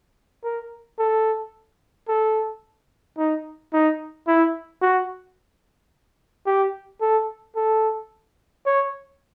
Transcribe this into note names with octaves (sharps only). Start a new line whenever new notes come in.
A#4
A4
A4
D#4
D#4
E4
F#4
G4
A4
A4
C#5